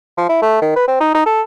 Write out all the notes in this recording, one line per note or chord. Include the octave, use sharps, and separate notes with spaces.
F3
E4
A3
D#3
B4
C4
D#4
D#4
A4